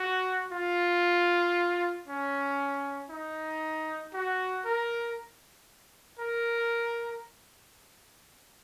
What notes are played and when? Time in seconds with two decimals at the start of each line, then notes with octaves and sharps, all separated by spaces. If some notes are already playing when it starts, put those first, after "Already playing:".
Already playing: F#4
0.52 F4
2.07 C#4
3.10 D#4
4.14 F#4
4.65 A#4
6.19 A#4